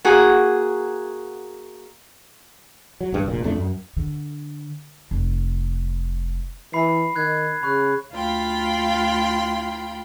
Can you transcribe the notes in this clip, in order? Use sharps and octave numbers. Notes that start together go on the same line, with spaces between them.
A#3 F#4 G#4
F#3
A1 G2
F1 A#1 A#2
A#1 F2 A3 D4
F#2
D3
F1
E3 B5 C7
D#3 F#6 G#6
C#3 B5 C#6 F#6
D2 F4 F5 G5 B5 C6